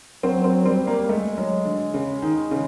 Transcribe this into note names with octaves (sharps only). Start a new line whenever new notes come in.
F#3 C4
C4
G3 C4
A#3
G#3 A3
F#3
D3
C#3
D#3
C#3